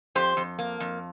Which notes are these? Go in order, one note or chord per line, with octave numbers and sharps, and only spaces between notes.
F2 G4 C5
F2
A#3
F2